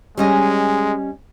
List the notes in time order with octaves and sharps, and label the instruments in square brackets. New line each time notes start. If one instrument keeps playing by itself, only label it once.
[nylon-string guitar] G3 C#4 D#5 [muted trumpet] G#3